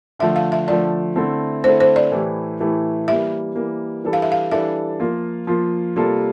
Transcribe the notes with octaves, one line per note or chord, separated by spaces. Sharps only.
D3 F3 A3 E5
F5
E5
D3 F3 A3 D5
D3 A3 C4 E4 A4
D3 A3 C4 E4 A4 C5
C5
D5
A2 E3 A3 E4 G4
A2 E3 A3 E4 G4
E3 G3 A#3 E5
E3 G3 A#3
E3 G3 D4 A4
F5
E5
F5
E3 G3 D4 A4 E5
F3 A#3 F4
F3 A#3 F4
C3 G3 A#3 F4 A4